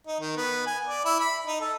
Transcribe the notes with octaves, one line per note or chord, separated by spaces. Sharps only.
D#4
D#3
B3
G#5
D5
E4
B5
D#4
A4